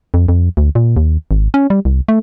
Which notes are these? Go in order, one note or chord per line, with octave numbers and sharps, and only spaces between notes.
F2
F2
D2
A#2
D#2
G#1
C#4
G3
C2
A3